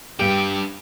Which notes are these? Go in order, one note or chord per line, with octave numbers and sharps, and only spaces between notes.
G2 D4 G4 G5